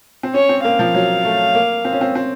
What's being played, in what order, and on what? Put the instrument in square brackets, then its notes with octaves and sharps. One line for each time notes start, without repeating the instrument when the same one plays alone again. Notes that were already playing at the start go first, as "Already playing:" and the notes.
[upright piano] C4
[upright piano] C#4 [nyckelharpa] C#5
[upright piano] C4
[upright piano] A#3 [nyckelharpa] F5
[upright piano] F3
F#3
A3
A#3
C4
C#4
C4
C4